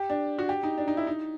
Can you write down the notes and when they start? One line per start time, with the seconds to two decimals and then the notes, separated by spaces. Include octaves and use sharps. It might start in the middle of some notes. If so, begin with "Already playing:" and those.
Already playing: G4
0.10 D4
0.39 F#4
0.49 G4
0.63 D#4
0.78 D4
0.88 D#4
0.97 E4
1.07 D#4